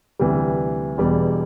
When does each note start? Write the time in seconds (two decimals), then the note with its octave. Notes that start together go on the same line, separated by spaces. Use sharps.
0.20 D2 C3 E3 G3
0.98 E1 E2 B2 G3